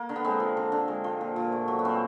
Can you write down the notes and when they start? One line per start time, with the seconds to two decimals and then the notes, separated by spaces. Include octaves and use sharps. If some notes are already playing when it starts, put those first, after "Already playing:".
Already playing: A#3
0.09 D3
0.16 B3
0.24 G#3 C4
0.40 F3
0.57 D3
0.72 D3
0.88 G#3
1.04 F3
1.21 A#2
1.36 A#2
1.52 A3
1.68 F#3
1.79 B3
1.85 A#2 C4